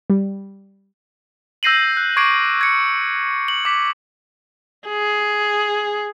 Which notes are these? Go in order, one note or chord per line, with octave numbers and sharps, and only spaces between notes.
G3
E6 G6 A#6 C7 D#7 F#7
F#6
C#6 D6 G#6 C7 D7
G#6 C#7
F#7
D6 B6
G#4